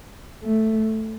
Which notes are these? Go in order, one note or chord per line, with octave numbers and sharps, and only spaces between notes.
A3